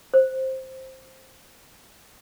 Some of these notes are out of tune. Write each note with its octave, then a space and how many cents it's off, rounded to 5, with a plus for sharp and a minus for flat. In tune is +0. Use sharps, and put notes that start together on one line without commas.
C5 +5